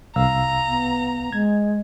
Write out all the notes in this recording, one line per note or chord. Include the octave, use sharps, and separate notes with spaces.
C2 F5 A#5 E6
B3
G#3 G#6